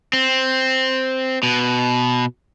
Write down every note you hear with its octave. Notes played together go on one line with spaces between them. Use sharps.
C4
B2